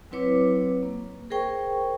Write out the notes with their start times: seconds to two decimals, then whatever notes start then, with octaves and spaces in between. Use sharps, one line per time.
0.11 F#3 C4 E4 B4 C#5 D6
0.83 A#3
1.30 G#4 A#4 C5 G5 C#6